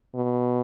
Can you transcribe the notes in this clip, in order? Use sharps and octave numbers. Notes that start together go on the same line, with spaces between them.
B2